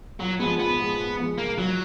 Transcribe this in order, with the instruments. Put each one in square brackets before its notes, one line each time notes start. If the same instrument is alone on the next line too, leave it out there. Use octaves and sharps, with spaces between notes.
[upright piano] A#2 [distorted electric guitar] F#3
[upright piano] F3 G#3 [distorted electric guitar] B3
[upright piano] A#2 [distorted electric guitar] B3
[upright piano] F3 G#3
A#2
F3 G#3
[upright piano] A#2 [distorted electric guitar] A#3
[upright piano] F3 G#3 [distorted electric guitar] F#3